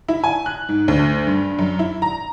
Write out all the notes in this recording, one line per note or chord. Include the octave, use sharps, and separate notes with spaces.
E4
G#5
F#6
G#2
D2
G2
F#2
E4
A#5